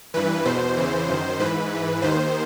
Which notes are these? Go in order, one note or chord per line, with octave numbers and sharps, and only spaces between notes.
G2 E3 B4
E2 B2 C5
E2 C#3 E3
F#2 D#3
G#2 E3 B4
G#2 E3
D#2 D#3 C5